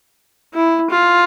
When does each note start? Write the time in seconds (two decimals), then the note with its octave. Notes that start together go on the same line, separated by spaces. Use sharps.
0.54 E4
0.90 F4